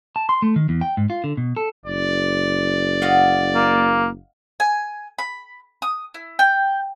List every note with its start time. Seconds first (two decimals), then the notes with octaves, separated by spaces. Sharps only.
0.16 A5
0.29 C6
0.42 A3
0.56 D#3
0.69 E2
0.81 G5
0.97 G#2
1.10 F4
1.24 D3
1.37 B2
1.57 A4
1.86 F#1 D5
3.02 D#5 F5 F#5
3.55 A#3
4.60 G#5
5.18 B5
5.82 D#6
6.14 E4
6.39 G5